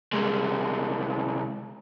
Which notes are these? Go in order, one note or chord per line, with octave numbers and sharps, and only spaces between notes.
C2 G#3